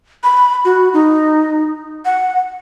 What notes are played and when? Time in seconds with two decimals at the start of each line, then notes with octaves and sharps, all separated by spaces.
0.23 B5
0.65 F#4
0.94 D#4
2.05 F#5